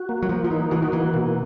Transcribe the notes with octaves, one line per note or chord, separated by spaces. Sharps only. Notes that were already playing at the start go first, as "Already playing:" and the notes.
Already playing: F#4
A#3
F#3
F3 A#3
F3
E3 D#4
E3 F#4
D#3
E3 A#3
B2